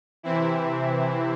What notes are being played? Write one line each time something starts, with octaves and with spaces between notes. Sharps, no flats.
C3 E3 C4 E4